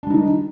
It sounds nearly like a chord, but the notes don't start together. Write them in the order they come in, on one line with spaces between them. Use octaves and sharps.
D4 G3 D#4 D#3